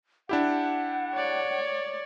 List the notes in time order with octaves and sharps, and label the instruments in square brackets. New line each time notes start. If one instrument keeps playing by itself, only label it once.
[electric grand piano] D4 E4 G4 [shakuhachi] F#5
[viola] C#5 D5